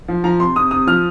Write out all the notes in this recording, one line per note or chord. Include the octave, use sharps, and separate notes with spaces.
F3
F3 A#5
C3 C6
C3 D#6
C3 D#6
F3 F6